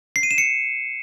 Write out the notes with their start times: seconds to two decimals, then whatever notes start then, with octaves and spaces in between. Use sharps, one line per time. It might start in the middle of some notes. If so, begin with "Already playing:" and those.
0.16 C7
0.23 D#7
0.31 E7
0.38 C#7